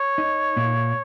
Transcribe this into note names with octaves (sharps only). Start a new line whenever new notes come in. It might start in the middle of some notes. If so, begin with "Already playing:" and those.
Already playing: C#5
D#4
A#2